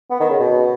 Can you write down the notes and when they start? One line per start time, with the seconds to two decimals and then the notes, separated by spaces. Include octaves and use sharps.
0.11 B3
0.20 D#3
0.30 C#3
0.40 B2